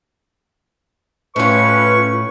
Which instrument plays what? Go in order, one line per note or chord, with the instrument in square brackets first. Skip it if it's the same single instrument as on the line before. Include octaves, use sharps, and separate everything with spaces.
[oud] A2 F4 [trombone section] C#4 B4 [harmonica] C#6